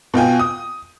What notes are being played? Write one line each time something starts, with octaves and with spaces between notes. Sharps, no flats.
B2 F4 G5 G#5
D#6